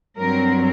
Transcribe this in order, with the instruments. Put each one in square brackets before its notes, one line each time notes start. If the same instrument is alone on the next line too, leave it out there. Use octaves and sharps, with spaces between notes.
[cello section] G2 F#3 C4 A#4